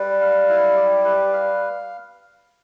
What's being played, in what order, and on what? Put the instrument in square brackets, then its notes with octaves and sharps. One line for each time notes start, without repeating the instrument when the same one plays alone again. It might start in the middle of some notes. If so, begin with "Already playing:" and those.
Already playing: [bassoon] G3 [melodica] B4
[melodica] F5
E4
G4
B4
F5